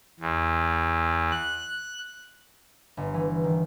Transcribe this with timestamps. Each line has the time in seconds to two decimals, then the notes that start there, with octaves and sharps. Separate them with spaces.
0.20 E2
1.32 F#6
2.97 G1
3.14 E3
3.44 D#3